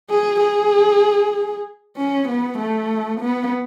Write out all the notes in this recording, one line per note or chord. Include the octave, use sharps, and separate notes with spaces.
G#4
G#4
C#4
B3
A3
B3